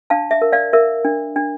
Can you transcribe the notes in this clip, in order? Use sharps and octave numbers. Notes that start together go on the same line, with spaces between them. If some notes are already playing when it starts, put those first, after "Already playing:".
D4 F5 A5
E5
A#4
D5 F5
A#4 E5
D4
D4